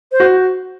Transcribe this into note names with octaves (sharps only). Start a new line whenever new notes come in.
C5
F#4